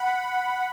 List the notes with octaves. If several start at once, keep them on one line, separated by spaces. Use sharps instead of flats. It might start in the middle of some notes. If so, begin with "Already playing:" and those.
Already playing: F#5 B5